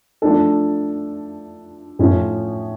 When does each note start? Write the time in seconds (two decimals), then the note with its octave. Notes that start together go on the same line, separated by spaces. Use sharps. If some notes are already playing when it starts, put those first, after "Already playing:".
0.22 F3 A3 D4 A4
1.99 A2 F3 C#4 E4